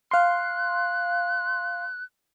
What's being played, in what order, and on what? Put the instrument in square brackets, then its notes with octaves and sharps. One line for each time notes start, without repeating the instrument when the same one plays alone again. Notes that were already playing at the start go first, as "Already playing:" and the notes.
[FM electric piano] F5 C6 [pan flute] F#6